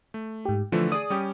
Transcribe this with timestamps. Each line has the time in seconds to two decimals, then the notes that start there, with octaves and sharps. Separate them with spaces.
0.14 A3
0.45 G#2 G4
0.72 D3 E3 F3 A3
0.92 G#4 D5 D#6
1.10 G3 C#4 G4